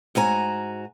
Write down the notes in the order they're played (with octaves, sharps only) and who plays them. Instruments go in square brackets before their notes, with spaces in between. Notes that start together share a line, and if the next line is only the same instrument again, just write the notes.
[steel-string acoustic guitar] G#2 F#4 G#5 A#5